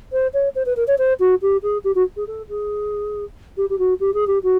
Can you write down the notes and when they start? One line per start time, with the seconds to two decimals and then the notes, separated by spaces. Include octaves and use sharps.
0.12 C5
0.34 C#5
0.55 C5
0.66 B4
0.76 A#4
0.87 C#5
0.98 C5
1.20 F#4
1.42 G4
1.63 G#4
1.84 G4
1.95 F#4
2.16 G#4
2.27 A4
2.49 G#4
3.57 G4
3.70 G4
3.79 F#4
4.00 G4
4.14 G#4
4.27 G4
4.43 F#4